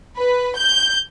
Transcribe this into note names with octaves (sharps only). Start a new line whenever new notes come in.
B4
G6